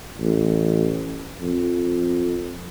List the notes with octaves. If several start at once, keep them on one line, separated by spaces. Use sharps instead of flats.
A1
F2